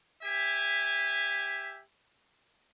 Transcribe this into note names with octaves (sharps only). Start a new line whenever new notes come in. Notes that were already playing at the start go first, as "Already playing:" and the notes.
G4 E5 G#5